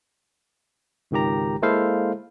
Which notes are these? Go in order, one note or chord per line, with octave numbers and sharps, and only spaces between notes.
G#1 C#2 D#3 G4 A#5
G#3 A#3 E4 A4 C5 F5